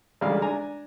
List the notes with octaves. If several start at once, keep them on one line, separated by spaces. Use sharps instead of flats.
A1 D2 G3 G#3 F5
D4 G#5 A#5